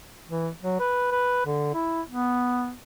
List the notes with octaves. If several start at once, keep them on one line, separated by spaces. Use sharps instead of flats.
E3
F#3
B4
B4
D3
E4
B3